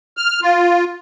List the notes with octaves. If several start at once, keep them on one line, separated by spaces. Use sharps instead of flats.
F6
F4